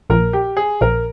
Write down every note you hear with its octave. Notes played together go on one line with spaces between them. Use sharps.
A#1 A#2 F3 A#4
G4
G#4
A#1 A#2 F3 A#4